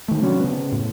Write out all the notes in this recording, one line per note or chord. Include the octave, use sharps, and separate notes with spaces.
D#3 A3
C3 F#3 C#4 D4
C#3 B3
A2